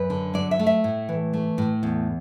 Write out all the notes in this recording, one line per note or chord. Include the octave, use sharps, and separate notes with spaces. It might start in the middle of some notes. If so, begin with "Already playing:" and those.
Already playing: F#2 B4
D3
F#3 D5
E5
A3
E5
A2
E3
A3
A2
E2